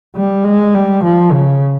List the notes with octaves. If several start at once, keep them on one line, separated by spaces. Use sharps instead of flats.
G3
G#3
G3
F3
C#3